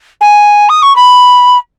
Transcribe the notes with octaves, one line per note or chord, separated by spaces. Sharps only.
G#5
D#6
C#6
B5